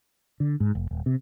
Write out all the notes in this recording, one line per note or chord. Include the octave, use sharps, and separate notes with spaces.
D3
G#2
F1
D#1
C3